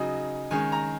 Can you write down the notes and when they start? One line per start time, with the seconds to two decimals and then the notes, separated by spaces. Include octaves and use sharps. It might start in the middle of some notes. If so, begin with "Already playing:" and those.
Already playing: C#3 F#3 D#4 G#5
0.51 D#3 G#3 C#4 G#5
0.72 A#5